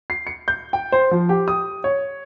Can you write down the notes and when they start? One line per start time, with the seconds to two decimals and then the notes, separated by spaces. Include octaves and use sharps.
0.10 C7
0.27 C#7
0.48 G6
0.73 G5
0.92 C5
1.11 F3
1.29 G4
1.48 D#6
1.84 C#5